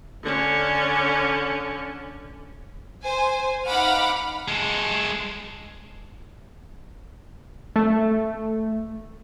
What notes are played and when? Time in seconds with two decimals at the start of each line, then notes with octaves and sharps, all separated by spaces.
0.23 D3 C#4
3.02 C5 G#5
3.66 D#4 F5 F#5 B5 D6 F6
4.48 G#3 A4
7.76 A3